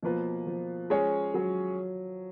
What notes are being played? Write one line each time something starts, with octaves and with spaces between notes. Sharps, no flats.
B2 F3 A#3 F4 B4
F3
G#3 C#4 G#4 C#5
F#3